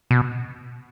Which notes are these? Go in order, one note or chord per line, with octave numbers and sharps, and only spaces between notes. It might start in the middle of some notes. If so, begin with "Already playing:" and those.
B2